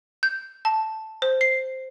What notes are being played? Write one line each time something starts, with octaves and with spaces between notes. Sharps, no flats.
G6
A5
C5
C7